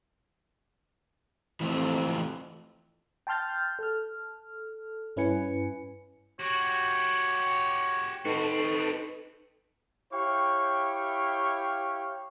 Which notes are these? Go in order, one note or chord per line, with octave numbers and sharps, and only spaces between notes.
F2 E3 A3 C4
G5 A5 C6 F6 G6 A6
A4 F6
G2 C#4 E4 B4 G#5 C#7
F#4 G4 C#5
C4 D#4 F#4 A4 B4
E4 G4 C#5 F5 G5 C#6